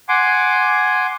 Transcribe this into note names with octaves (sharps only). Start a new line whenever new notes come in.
F#5 G#5 C6 D6